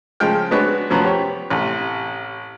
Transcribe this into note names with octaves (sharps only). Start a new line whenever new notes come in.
C#3 F3 G#3 G5 F6
G#3 B3 D4 F#4 B4 C#5
F#2 F3 F#3 B3
G4 C#5
A1 C3